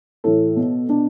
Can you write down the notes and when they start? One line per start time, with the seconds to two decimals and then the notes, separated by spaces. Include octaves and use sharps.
0.24 A2 E3 A4
0.56 B2
0.89 B2 D4